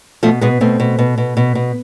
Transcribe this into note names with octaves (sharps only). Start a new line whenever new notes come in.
B2 F3 A3
B2 G#3 B3
B2 A3 C4
B2
B2
B2
B2
B2